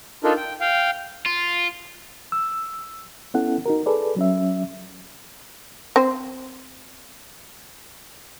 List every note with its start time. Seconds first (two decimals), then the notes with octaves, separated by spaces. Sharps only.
0.24 D4 D#4 F4 A4 A#4
0.37 G5
0.61 F5 G5
1.26 F4
2.32 E6
3.34 B3 C#4 E4 A4 F#5
3.66 D#4 F#4 A#4
3.86 G#4 A4 B4 D5
4.16 F#3 C#4 E5
5.96 C4 C5